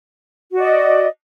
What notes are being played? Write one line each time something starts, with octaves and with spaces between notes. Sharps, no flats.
F#4 D5 D#5